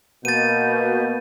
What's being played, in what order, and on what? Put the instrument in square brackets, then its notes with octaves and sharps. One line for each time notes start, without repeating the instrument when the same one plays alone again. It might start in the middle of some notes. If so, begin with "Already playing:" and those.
[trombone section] B2 [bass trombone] A#3 [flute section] D#5 G6 [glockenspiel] A6 D#7